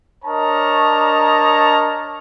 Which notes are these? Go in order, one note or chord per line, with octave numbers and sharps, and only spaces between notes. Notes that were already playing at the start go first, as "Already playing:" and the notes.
D4 A#4 C#5 D#5 A5 A#5